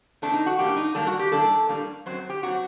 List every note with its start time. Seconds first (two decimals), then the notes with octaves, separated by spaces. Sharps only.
0.22 A2 A3 C4 D4
0.33 D#4
0.46 F#4
0.59 A2 G3 A#3 D4 G4
0.77 D#4
0.95 A2 G3 A#3 D4 A4
1.07 F#4
1.19 G4
1.32 A2 G3 A#3 D4 A4
1.69 A2 G3 A#3 D4
2.06 F#2 F#3 C4 C5
2.29 G4
2.42 F#2 F#3 C4 F#4